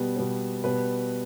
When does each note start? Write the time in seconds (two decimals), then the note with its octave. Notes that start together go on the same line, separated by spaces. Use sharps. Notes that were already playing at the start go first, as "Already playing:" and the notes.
Already playing: B2 G3 B3
0.17 B2 G3 B3
0.64 B2 G3 B3 B4